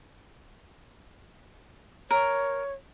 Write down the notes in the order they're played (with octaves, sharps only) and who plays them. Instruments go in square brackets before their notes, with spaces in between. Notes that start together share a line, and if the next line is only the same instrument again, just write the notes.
[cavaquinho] A#4 [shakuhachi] C#5